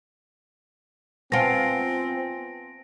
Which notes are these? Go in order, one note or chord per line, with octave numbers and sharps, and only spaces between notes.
B3 C4 F4 B4 G#5 A5 A#6 D7